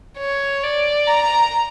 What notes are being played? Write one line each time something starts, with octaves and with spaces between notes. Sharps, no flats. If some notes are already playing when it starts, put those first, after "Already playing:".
C#5
D5
A#5